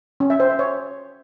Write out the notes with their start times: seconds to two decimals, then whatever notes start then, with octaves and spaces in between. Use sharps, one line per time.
0.20 C#4
0.30 E5
0.40 C5
0.49 E5
0.59 C#5